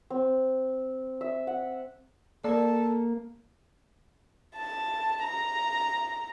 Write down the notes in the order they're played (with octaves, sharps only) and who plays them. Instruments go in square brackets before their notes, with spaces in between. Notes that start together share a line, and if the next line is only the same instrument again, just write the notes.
[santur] C4
E5
F#5
[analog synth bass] A#3 [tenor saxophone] A4 [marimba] A#4 D5
[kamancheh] A5
A#5